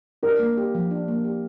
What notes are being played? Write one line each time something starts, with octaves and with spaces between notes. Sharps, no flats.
D4 A#4
A#3
G4
F3
D4
A#3
G4